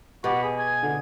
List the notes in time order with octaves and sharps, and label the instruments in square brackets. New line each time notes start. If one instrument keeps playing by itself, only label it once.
[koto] B2 [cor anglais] F#4 [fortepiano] G4 D6 [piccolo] B5
[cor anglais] G#4
[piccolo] G#6
[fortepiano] D3